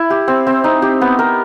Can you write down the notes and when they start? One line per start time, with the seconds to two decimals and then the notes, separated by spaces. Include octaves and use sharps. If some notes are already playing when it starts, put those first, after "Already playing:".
Already playing: E4
0.10 G4
0.28 C4
0.47 C4
0.64 D#4
0.82 G4
1.01 B3
1.19 A#4